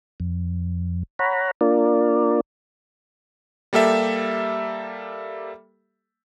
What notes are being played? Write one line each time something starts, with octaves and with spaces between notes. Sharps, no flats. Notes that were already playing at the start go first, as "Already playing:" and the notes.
F2
C#5 F#5 A#5 B5
A#3 D4 F4 A#4 D5
G3 A#3 G4 A4 E5